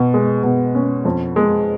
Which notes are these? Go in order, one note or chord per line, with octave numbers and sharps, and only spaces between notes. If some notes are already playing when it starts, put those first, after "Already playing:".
Already playing: B2
G#3
B2
C#4
F2
G#3